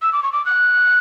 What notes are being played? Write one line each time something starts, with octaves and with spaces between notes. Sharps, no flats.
E6
D6
C#6
D6
F#6